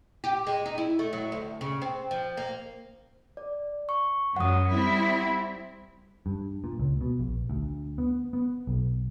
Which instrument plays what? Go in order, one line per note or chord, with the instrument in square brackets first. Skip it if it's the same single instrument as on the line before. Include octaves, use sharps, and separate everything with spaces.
[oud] G4
G#3
D#4
E4
A3
F#3
D2
C#3
C4
F3
A#3
[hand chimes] D5
C#6
[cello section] F#2 F#3 [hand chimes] F#5 D#6
[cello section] G3 C4 E4
[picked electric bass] G2
A#2
C#2
B2
A#1
D2
B3
B3
B1